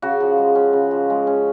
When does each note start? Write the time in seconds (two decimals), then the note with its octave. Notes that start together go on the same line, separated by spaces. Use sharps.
0.02 C#3 F#4
0.20 F3
0.38 G#3
0.55 C#4
0.73 C#3
0.91 F3
1.10 G#3
1.27 C#4